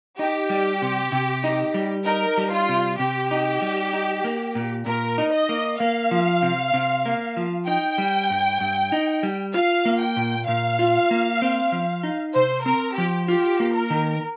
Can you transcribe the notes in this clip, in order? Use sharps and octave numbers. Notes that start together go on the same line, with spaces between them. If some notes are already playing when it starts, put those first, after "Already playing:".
D#4 G4
G3
C3
C3
D#4
G3
D#4 A#4
G3
F4
C3
C3 G4
D#4
G3
D#4
A#3
A#2
A#2 A#4
D#4
D#5
A#3
A#3 F5
F3
C3
C3
A#3
F3
D#4 G5
G3
G2
G2
D#4
G3
F4 F5
A#3
G5
A#2
A#2 F5
F4
A#3
C4
F3
D#4
C3 C5
C4 A#4
F3 G4
F4 G4
A#3
A#4
D#3